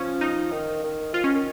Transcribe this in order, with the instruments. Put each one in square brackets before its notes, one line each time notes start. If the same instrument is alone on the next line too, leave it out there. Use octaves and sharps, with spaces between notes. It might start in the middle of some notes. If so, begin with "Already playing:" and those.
Already playing: [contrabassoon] F3 [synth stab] C#4
[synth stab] D#4
[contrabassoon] D#3
D#3
[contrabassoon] F3 [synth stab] F4
[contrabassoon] D#3 [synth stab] C#4
[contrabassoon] D#3